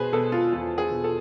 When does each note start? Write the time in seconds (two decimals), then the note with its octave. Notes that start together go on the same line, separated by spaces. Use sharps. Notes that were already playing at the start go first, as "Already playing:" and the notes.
Already playing: B2 G#4 B4 C5
0.12 B2 A4
0.32 F4
0.52 E2 F4
0.78 G#4
0.91 B2
1.04 A4